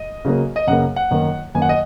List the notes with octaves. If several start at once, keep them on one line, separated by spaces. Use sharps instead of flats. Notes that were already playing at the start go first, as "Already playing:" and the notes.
Already playing: D#5
C#3 F#3 A#3
D#5
F#2 C#3 A#3 F#5
F#5
F#2 D#3 A#3
F#2 D#3 A#3 G#5
F#5
D#5